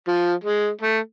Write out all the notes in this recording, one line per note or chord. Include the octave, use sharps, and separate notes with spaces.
F3
G#3
A3